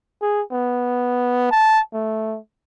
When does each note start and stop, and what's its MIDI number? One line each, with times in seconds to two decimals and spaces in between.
0.22 0.42 68
0.52 1.49 59
1.51 1.80 81
1.93 2.38 57